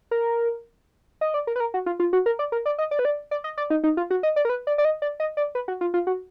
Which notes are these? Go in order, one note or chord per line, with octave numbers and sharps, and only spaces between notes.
A#4
D#5
D5
A#4
B4
A#4
F#4
F4
F4
F#4
A#4
D5
A#4
D5
D#5
D5
B4
D5
D5
D#5
D5
D#4
D#4
F4
F#4
D#5
D5
A#4
B4
D5
D5
D#5
D5
D#5
D5
B4
F#4
F4
F4
F#4